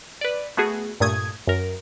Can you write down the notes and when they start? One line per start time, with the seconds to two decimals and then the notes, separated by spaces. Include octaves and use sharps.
0.21 B4 D5
0.57 A3 B3 F#4 G#4
1.00 G2 A#2 A3 D#6 G#6
1.47 F#2 A#4